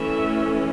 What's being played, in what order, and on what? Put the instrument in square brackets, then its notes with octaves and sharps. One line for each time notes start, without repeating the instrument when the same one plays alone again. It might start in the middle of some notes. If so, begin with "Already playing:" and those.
Already playing: [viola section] E3 A3 C#4 E5